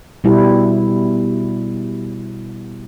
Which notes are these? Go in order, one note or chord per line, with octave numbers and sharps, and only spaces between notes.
B2 G3 E4